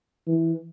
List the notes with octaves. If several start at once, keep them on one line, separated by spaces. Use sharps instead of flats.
E3